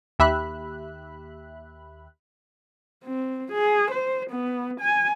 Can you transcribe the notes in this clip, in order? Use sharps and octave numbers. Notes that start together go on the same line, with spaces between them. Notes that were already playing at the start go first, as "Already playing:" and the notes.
D#2 G4 E5 B5 F#6
C4
G#4
C5
B3
G#5